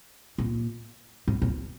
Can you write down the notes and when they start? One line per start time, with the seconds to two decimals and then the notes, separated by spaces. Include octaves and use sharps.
0.38 A#2
1.28 A2
1.42 A#2